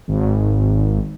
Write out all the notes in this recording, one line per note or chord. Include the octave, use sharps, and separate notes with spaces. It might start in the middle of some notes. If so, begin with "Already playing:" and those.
G#1